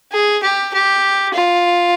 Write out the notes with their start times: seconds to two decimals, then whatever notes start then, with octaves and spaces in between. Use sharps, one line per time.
0.12 G#4
0.43 G4
0.73 G4
1.34 F4